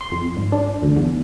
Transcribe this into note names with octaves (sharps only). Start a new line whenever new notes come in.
C6
F2
G#1
D4
D2
E2